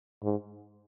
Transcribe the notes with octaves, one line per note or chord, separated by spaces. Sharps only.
G#2